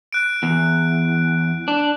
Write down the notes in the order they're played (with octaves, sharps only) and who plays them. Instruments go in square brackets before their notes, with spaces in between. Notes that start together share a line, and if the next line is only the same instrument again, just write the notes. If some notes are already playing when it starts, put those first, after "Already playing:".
[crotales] F#6 D7
[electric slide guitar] E2
D4